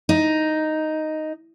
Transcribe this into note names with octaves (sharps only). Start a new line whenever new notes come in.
D#4